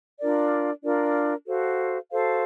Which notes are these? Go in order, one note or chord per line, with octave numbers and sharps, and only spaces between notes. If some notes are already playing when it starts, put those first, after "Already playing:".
D4 F4 A#4 D5
D4 F4 A#4 D5
F#4 A4 C5 F5
F#4 A4 C5 F5